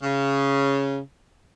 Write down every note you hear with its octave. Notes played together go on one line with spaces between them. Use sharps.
C#3